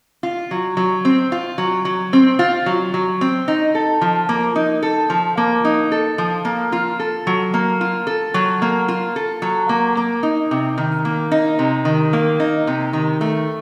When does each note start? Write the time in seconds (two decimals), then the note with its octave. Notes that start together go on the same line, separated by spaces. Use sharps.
0.23 F4
0.51 F#3
0.77 F#3
1.05 C4
1.32 F4
1.58 F#3
1.85 F#3
2.13 C4
2.39 F4
2.66 F#3
2.94 F#3
3.21 C4
3.48 D#4
3.75 A4
4.01 F3
4.29 A#3
4.56 D#4
4.82 A4
5.10 F3
5.37 A#3
5.65 D#4
5.92 A4
6.18 F3
6.45 A#3
6.72 F4
7.00 A4
7.27 F#3
7.54 A#3
7.81 F4
8.07 A4
8.34 F#3
8.62 A#3
8.88 F4
9.16 A4
9.42 F#3
9.69 A#3
9.97 A#3
10.23 D#4
10.51 C3
10.78 D#3
11.05 A#3
11.32 D#4
11.59 C3
11.85 D#3
12.13 A#3
12.40 D#4
12.67 C3
12.93 D#3
13.21 A3